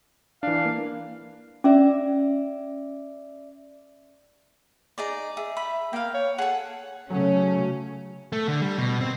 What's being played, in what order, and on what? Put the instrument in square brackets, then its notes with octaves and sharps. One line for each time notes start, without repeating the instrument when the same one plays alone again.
[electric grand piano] E3 D4 [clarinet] F5
[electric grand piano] A#3
[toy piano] C#4 [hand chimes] D5 E5 D6
[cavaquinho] D#4 G#4 D5
[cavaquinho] G#4 [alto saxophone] E5
[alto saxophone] E5 [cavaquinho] B5
[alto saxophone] A#3 [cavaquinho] F5 G5
[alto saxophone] C#5
[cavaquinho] G#4 A4 [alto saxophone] F#5
[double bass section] C#3 A3 [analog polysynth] F#3 [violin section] C#4
[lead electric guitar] A3
D3
G3
B2
C4